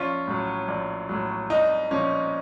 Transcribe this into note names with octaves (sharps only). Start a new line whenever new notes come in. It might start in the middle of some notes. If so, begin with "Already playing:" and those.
Already playing: A#1 C#4 F4
A2 F#3
A#1
A2 F#3
C2 D#4
A#2 F3 C#4